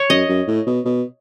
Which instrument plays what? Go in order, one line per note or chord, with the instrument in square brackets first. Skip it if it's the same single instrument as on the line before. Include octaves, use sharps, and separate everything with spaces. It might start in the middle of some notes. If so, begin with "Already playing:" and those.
Already playing: [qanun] C#5
[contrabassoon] F#2 [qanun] D#5
[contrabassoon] F#2
A2
B2
B2